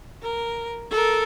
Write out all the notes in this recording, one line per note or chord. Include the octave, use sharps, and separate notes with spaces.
A#4
A4 A#4